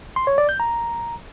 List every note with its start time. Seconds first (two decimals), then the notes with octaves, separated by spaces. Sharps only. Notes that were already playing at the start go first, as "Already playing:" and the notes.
0.16 C6
0.27 C#5
0.38 D5
0.49 G6
0.60 A#5